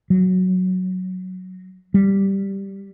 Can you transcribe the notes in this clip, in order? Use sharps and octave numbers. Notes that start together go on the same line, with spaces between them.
F#3
G3